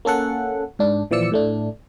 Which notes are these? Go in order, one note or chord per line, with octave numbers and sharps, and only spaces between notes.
A#3 C#4 A4 F#5
G#2 D4
A#2 E3 F3 D5 E6 C#7
A2 A3 D4